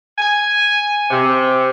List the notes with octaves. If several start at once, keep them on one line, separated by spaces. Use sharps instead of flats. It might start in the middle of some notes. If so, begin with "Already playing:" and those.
G#5
C3